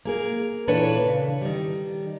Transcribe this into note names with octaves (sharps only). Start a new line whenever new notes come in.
A#3 G#4 A#4
A#2 E3 D4 A4 B4 C#5
C#3
D#3 G3